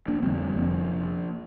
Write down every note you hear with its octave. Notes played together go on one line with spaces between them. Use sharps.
A#3 D4
F2 D3 G3 C4
F1 F3 A#3